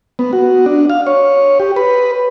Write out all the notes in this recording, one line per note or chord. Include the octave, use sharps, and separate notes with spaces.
B3
F#4
D4
F5
C#5
G4
B4